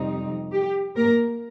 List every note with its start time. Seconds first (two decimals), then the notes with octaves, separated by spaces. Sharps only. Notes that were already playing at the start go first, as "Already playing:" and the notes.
Already playing: F2 C3 G3 C4 D#4
0.52 G4
0.96 A#3 A#4